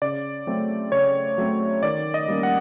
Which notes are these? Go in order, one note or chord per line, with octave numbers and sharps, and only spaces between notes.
C#3 D5
F#3 A3 C4
C#3 C#5
F#3 A3 C4
D#3 D5
D#5
G3 A#3 C#4
F#5